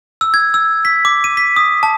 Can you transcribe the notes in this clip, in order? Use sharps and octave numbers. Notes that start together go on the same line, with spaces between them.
E6
G#6
E6
B6
D6
D#7
B6
D#6
A5